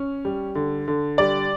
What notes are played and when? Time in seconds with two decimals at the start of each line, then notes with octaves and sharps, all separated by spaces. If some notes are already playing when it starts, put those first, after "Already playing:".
Already playing: C#4
0.25 G3
0.55 D3
0.88 D3
1.18 G3 D5